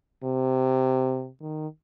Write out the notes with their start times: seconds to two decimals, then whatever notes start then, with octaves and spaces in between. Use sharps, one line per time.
0.24 C3
1.41 D#3